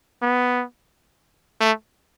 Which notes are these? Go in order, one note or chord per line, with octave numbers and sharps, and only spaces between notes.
B3
A3